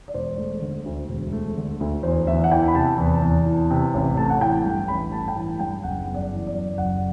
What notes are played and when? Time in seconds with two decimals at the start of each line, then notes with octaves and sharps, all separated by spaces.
0.08 D5
0.14 E1 C5
0.38 A3
0.62 D3
0.85 D2
1.09 E1
1.32 A3
1.57 D3
1.81 D2
2.03 E2 C5
2.27 E2 E5
2.44 F#5
2.52 E3 G5
2.68 B5
2.74 C3 A5
2.98 E2
3.22 E2
3.46 E3
3.70 C3
3.94 A1
4.17 A3 A5
4.30 F#5
4.41 E3 G5
4.65 G2
4.88 A1 B5
5.12 A3 A5
5.28 G5
5.36 E3 A5
5.60 G2 G5
5.84 F#1 F#5
6.07 B3
6.15 D5
6.31 E3
6.47 D5
6.55 F#2
6.78 F#1 F#5